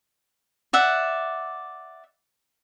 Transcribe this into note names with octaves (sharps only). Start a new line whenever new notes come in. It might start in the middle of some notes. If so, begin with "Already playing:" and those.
D5 E5 F#5